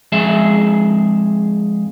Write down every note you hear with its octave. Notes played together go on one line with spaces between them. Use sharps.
F2 G#3 G#4 E5